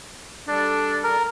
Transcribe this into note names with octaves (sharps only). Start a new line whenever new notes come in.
G3 D4 A4 D5
A#4